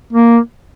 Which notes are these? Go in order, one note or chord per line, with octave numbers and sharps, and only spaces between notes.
A#3